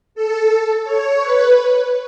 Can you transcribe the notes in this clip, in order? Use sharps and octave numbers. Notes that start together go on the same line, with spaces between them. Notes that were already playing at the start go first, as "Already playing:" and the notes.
A4
C#5
B4